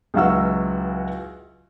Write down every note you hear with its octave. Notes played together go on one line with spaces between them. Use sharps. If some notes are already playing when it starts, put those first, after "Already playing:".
C#2 E3 F#3 F#4 E6